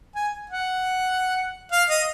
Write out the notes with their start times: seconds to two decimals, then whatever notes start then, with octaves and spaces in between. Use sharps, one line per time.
0.15 G#5
0.50 F#5
1.72 F5
1.89 D#5